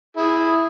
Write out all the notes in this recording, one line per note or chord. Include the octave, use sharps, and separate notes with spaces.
E4 G#4